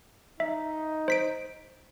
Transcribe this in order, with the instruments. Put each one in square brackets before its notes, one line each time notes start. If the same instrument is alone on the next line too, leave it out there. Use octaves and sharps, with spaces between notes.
[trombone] D#4 [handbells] E5
[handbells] C5 B6 D7